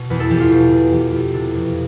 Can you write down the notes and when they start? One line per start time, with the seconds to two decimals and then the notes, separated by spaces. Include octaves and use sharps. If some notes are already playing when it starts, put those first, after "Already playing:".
Already playing: B2
0.10 E2 B4
0.20 A4
0.31 E2 G4
0.40 F4
0.51 B2 G4
0.71 B2
0.92 E2 G4
1.13 E2
1.34 C3 A4
1.54 F2